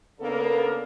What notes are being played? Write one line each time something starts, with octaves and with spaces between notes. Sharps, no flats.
C#3 A#3 B3 D4 A4 A#4